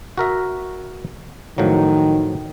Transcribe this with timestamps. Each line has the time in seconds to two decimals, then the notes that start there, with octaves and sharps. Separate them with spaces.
0.18 F#4 A#4 E5
1.58 A2 D#3 F3 F#3